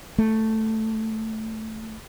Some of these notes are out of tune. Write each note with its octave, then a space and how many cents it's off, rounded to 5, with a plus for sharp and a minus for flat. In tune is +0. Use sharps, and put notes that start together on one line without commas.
A3 +5